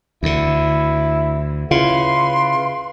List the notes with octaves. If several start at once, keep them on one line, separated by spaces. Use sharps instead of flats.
D2 D3 E4
C#3 E4 F4 B4 C6